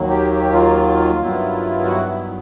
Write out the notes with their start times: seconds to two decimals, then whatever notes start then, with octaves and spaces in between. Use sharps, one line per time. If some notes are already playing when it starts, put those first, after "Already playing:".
Already playing: D#2 D#3 F#3 A#3
0.09 G4
0.32 G4
0.53 F4
1.18 G2 D#3 F#3 B3 E4
1.84 F#4
2.05 E4